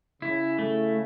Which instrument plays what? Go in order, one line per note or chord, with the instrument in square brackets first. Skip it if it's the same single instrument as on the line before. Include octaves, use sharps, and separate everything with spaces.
[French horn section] C#3 [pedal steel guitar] E4
[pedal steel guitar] A3